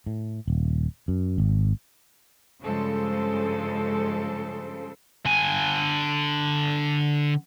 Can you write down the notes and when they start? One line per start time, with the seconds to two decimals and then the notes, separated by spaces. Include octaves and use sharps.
0.06 A2
0.48 D#1
1.08 F#2
1.38 G#1
2.63 G2 C#3 F3 G#3 A4 C5
5.26 D3 G#5